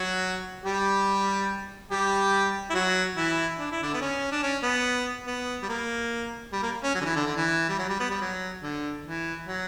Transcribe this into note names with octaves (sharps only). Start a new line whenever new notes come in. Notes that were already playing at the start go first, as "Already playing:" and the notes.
Already playing: F#3 F#4
G3 G4
G3 G4
E4
F#3 F#4
E3 E4
D4
E4
D3 D4
B3
C#4
D4
C#4
B3
B3
G3
A#3
G3
A#3
C#4
F#3
D3
E3
D3
D3
E3
G3
F#3
G3
B3
G3
F#3
D3
E3
F#3